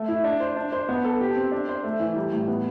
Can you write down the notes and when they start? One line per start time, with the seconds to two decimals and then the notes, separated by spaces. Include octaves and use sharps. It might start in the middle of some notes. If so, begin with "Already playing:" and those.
Already playing: A3
0.08 E4
0.24 D4
0.40 C5
0.56 D4
0.72 C5
0.89 B3
1.05 A4
1.21 G4
1.36 C4
1.52 D4
1.69 C5
1.84 A3
2.00 E3
2.16 G3
2.32 A2
2.48 B3